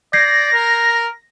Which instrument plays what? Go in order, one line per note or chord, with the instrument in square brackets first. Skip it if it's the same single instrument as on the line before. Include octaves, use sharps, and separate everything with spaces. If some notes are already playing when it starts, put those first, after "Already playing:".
[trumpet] D5 [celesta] G6 G#6 C7 [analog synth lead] A#6
[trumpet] A#4